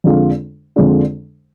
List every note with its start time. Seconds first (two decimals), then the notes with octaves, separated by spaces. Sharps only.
0.04 F2 D3 G#3 D4 F4
0.76 F2 D3 G#3 D4 F4